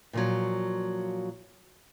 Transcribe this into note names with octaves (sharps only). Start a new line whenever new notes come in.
A#2 F3 F#3